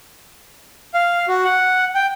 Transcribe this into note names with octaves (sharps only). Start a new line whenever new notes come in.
F5
F#4
F#5
G5